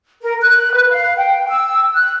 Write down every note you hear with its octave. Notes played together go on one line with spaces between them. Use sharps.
A#4
F#6
B4
F5
G5
E6
F#6